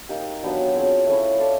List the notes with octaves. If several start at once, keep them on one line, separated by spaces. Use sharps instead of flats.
A#3 D#4 G4
F#3 B3 D4 G4
C4 F4 G#4 C#5
A3 C#4 E4
E4 A4 D5 F5